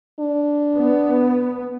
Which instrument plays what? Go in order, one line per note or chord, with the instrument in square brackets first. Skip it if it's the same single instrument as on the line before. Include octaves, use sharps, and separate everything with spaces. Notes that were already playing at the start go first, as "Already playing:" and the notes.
[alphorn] D4
[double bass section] B3